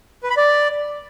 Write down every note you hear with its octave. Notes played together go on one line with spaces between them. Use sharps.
B4
B5
D5